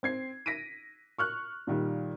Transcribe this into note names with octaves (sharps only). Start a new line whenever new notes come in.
C4 G#6 C7
A#6 B6 D7 D#7
C#6 F6 F#6
A#2 D#3 G3